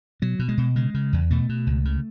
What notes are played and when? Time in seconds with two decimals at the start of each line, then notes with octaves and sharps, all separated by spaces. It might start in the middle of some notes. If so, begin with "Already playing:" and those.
0.22 B2 F#3
0.39 B2
0.49 G#3
0.58 B2
0.76 C#3 G#3
0.94 C#3
1.13 E2
1.31 B2 A3
1.49 B2
1.67 C#2
1.85 C#3